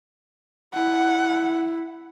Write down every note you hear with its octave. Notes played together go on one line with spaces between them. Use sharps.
E4 F#5